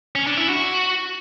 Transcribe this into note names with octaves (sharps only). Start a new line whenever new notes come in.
C#4
D4
E4
F#4